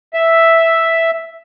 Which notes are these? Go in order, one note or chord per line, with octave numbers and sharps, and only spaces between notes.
E5